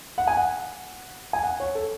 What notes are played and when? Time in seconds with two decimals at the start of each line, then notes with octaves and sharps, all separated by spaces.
0.18 F#5
0.27 G#5
0.37 F#5
1.33 G#5
1.43 F#5
1.60 C#5
1.75 A4